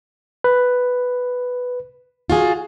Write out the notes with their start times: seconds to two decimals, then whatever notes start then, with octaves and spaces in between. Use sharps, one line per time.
0.44 B4
2.30 F4 F#4 G#4